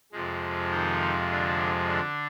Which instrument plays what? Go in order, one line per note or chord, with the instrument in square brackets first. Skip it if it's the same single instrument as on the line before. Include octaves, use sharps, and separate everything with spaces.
[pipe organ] F2 C3 F3 G#3
D#3 D#4
D3 D4
D3 D4